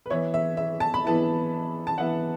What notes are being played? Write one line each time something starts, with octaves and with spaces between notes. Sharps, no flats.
B4
E3 B3 E4 C#5
E5
E5
A5
B5
E3 B3 E4 A5
A5
E3 B3 E4 F#5